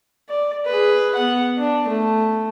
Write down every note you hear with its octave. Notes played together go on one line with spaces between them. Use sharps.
D5
G#4 B4
B3 F#5
D4
A3